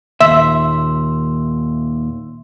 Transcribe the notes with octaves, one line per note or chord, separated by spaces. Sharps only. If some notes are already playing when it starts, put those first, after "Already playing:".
D#2 A#2 E5 C6 E6